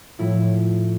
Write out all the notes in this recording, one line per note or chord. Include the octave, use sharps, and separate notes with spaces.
A2 F3 E4